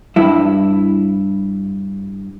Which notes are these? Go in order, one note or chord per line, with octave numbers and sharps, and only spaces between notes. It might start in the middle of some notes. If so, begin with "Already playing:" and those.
G2 E4